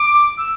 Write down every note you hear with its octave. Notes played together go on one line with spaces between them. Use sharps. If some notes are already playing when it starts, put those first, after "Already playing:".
Already playing: D6
E6